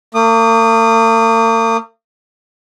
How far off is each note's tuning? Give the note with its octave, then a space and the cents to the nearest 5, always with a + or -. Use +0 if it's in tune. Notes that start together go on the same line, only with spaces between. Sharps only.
A#3 -45 D#6 -30